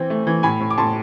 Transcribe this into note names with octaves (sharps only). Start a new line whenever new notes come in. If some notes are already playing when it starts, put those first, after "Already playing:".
Already playing: E3 C4
A3
E3
A2 G#5 B5
A2
D6
A2 A5 C6